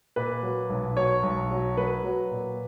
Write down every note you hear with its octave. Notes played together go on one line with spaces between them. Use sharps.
A#2 B4
F#3
B1
F#3 C#5
B1
F#3
F#3 B4
F#3
A#2